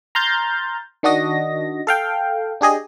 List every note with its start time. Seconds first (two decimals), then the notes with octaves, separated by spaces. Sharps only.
0.15 A#5 C6 F6 G6 A6
1.03 D#3 D4 F#4 D#5 A#6
1.87 A4 F5 G5
2.61 D4 G4 G#4 D#5